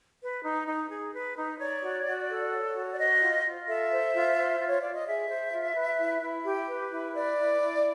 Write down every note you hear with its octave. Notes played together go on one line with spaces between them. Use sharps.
B4
D#4
D#4
G#4
B4
D#4
C#5 D5
F#4
F#4
A4
C#5
F#4
D5
C5 D#5
F4
F4
A4 E5
C5
F4
C5
F4
C#5
F4 D5
D#5
G#4 E5
C5
F4
B4
E4
E4
G4
B4
E4
B4 D5
E4
E4